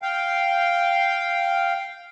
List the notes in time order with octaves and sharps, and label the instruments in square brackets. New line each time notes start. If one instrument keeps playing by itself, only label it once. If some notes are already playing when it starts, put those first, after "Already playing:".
[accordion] F5 G5